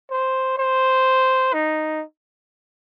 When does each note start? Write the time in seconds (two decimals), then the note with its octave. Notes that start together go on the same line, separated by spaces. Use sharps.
0.11 C5
0.58 C5
1.53 D#4